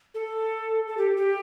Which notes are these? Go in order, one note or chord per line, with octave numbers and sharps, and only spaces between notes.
A4
A4
G4
G4